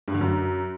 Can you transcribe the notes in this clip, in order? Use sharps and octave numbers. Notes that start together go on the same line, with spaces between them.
G2
D3
F#2